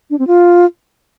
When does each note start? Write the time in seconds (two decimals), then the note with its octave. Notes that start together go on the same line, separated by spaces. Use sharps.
0.10 D4
0.19 C4
0.27 F4